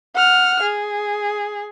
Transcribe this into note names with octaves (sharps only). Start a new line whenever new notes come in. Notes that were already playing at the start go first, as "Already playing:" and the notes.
F#5 F6
G#4